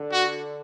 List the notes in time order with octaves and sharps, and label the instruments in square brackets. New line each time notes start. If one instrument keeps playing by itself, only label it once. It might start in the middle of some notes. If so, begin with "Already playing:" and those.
Already playing: [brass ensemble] D3
[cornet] F#4